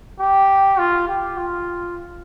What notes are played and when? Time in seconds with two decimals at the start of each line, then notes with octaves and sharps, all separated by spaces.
0.20 G4
0.79 F4
1.08 G4
1.38 F4